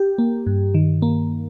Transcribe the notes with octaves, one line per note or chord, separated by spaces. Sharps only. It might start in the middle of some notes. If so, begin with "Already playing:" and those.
Already playing: G4
A#3
G2
D#3
A#3